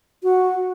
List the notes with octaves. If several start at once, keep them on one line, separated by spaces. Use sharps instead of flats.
F#4